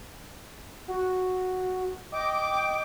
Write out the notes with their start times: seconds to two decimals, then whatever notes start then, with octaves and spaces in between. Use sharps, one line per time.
0.88 F#4
2.12 D#5 G5 D6